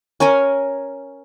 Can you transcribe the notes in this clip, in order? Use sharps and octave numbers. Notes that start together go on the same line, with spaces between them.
C#4 A#4 C#5 G#5